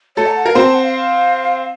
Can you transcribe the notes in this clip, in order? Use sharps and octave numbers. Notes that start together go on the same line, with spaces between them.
A3 A4 C#5
A#5
F#5
A#4 F5
C4 C5 F#5
A5
F#5
F5